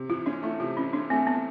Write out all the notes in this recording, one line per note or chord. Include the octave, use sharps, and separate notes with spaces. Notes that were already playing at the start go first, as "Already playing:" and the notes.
Already playing: C3
E3 F4
C#4 D4
A3 E4
C3 F4
E3 C#4
C#4 D4
A3 C4
B3